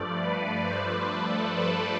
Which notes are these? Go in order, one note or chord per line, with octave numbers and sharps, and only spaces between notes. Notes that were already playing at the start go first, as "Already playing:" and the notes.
Already playing: G2 F3 A3 D5
B4
C5
B4
A4
B4